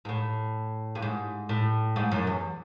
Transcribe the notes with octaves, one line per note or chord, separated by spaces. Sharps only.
G#2
A2
G2
G#2
A2
G#2
F#2
E2